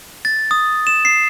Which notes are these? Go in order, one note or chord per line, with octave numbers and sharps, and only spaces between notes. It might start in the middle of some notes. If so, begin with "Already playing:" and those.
A6
D#6
E7
C7